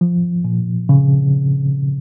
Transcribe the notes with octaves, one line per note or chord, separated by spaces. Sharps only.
F3
A#2
C#3